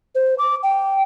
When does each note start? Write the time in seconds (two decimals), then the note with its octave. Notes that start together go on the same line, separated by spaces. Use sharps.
0.15 C5
0.38 D6
0.63 G5